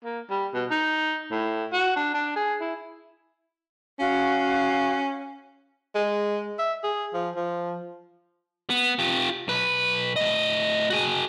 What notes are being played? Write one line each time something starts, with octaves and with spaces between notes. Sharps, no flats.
A#3
G3
B2
D#4
A2
F#4
D4
D4
G#4
E4
C#4 F#4 F5
G#3
E5
G#4
F3
F3
B3
F4 G4
B1 B4
A2 D#5
F#4 G#4